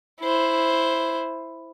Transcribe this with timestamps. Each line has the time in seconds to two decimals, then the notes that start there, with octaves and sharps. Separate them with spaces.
0.21 E4 C5